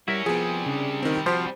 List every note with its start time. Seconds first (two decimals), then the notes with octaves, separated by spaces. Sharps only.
0.08 G3 C#4 E4 F#4 A#4 E5
0.26 C3 F3 G3 B3 G#4 G#5
0.66 C#3 D4
1.03 D#3 C4
1.26 F3 F#4 G4 C5